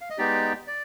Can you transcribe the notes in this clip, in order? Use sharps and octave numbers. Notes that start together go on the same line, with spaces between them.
F5
D#5
G#3 B3 D#4 G4 D5
D5